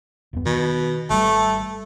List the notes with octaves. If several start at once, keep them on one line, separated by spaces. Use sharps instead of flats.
D#1 F#2 B3
B2 D#3
G#1 G3 A3